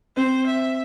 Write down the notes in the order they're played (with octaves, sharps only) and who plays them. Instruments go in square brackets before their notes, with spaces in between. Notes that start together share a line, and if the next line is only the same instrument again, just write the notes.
[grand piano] C4 [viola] C5
[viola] E5